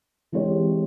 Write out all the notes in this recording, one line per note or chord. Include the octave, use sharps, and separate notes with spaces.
E3 G#3 C4 G4 C#5